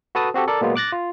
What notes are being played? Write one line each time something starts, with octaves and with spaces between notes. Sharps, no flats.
F#4 A4 B4 A5 D#6
C4 F#4 G4 A4
A4 A#4 D5
A#2 F#3 G#3 A#3 B3 F4
D6 F#6 A6 A#6
F4